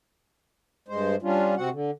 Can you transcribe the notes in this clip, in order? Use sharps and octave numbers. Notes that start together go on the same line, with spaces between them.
G2 G#3 C5
G3 C#4 D4 F4
C3 C4 F#4 F#5
D3